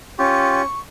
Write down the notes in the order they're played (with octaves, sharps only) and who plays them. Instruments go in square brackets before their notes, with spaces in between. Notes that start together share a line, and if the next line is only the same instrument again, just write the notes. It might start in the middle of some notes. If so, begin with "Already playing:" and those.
[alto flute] C#4 [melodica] F4 G4 [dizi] C#6